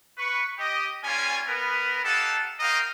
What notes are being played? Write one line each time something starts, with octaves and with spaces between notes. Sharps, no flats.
B4 C#6
G4 D#5
G3 A#3 C#4 F4 G#5
B3 A#4 B4
D#4 G4 A4 F5 F#5 A5
F#4 A#4 D#5 F5 G5 A#5